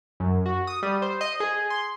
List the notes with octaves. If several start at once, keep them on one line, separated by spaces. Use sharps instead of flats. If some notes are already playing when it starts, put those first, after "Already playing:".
F#2
F#4
D#6
G3
C5
D#5
G#4
C6